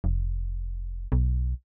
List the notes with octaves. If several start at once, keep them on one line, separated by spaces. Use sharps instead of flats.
F1
B1